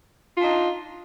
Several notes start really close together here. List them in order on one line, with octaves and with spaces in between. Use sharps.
F4 D4 D#4